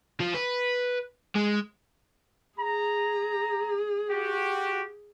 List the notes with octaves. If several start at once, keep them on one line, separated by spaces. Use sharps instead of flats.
F3
B4
G#3
G#4 A#5
F#4 G4